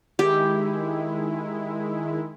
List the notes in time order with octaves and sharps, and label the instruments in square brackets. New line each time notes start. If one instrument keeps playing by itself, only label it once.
[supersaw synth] D#3 G#3 E4 [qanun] G4